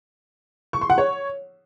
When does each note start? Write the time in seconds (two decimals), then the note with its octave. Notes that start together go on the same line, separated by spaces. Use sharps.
0.73 C#6
0.81 C6
0.90 F#5
0.98 C#5